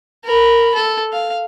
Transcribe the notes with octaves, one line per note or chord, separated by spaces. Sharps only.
A#4 B5
A4
F5